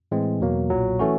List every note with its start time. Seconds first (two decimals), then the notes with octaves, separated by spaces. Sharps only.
0.11 A2 E3 G#3 C4
0.41 E2 B2 F#3 A#3
0.70 B1 A#2 F#3
0.99 E3 A3 C#4 F#4